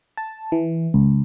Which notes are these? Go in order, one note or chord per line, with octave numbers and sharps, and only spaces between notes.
A5
E3
C#2